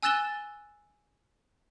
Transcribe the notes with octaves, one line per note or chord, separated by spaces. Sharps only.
G#5 E6 F#6 A6 E7 G7